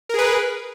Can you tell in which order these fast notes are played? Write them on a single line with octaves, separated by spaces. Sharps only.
A#4 G#4 B4